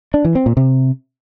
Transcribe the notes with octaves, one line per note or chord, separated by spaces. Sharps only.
D4
E3
C4
A#2
C3